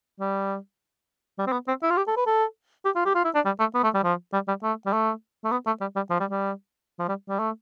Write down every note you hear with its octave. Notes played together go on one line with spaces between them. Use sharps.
G3
G3
C4
B3
C4
E4
F4
G4
A4
B4
A4
G4
F4
G4
F4
E4
D4
G3
A3
B3
A3
G3
F3
G3
G3
A3
G3
A3
A3
B3
A3
G3
G3
F3
G3
G3
F3
G3
G3
A3